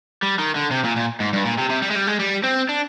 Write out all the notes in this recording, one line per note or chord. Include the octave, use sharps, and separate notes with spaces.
G3
D#3
D3
C3
A#2
A#2
G#2
G2
A#2
C3
C3
G3
G#3
G3
G#3
G3
C4
D4